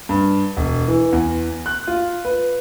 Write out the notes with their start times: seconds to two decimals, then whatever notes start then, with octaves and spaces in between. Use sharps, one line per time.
0.09 G2
0.57 E1
0.88 E3
1.12 E2
1.66 F#6
1.87 F4
2.25 B4